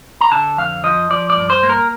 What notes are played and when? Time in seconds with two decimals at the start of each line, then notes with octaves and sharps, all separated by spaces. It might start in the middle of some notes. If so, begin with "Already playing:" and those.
0.21 A#5
0.31 D3 A5
0.58 F2 F5
0.84 F3 D#5
1.10 F3 D5
1.30 D5
1.36 G2
1.50 C5
1.63 A#3
1.69 A#4